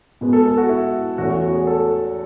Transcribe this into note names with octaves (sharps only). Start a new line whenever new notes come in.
B2 G#3 B3
A4
A4
F#4
E4
E2 B2 A3 C#4 F#4
F#4
F#4
G#4
A4